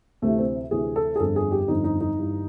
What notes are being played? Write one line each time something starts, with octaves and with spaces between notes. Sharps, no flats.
D2 C3 E3 A3
C4
D2 C3 E3 G#4
A4
G#4
G1 F2 D3 A4
G#4
G4
G1 F2 D3 D#4
D#4
D#4
G1 G2 E3